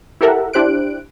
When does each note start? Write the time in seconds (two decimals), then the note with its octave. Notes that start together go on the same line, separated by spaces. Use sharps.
0.21 E4 G4 A4 A#4 E5 F#5
0.53 D4 E4 G4 C5 F#6 D7